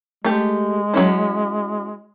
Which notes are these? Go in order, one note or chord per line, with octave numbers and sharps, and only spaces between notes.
G#3 A3 G4
F#3 C#4 E4